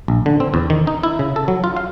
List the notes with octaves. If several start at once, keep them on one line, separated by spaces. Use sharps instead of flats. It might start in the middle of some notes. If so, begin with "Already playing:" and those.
A#1
D3
C4
E2
D#3
D#4
E4
C#3
A4
F#3
F4
F5